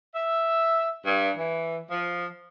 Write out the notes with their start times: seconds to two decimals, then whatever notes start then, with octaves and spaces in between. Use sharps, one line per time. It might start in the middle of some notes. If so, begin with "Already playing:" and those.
0.14 E5
1.06 G2
1.37 E3
1.90 F3